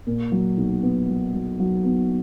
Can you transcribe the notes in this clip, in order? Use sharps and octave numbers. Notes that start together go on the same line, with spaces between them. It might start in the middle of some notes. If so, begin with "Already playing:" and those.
A#2
F#3
B1
B3
F#3
F#3
F#3
B3